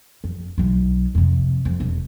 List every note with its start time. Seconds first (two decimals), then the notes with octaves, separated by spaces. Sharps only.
0.24 F2
0.58 B1 F#3
1.15 F2 C3
1.65 F2
1.80 E1